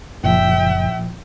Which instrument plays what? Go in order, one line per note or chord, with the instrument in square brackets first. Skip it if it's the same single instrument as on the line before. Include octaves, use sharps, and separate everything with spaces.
[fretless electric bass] F#1 [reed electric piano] A#2 F3 [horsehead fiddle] E5 G5